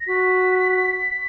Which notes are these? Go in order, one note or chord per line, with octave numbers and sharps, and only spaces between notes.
A#6
F#4 B6